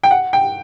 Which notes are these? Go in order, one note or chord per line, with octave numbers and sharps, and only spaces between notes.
G5
F#5
G5